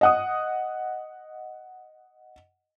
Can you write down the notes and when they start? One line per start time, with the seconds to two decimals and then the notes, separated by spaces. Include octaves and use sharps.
0.01 D#5 F#5 D#6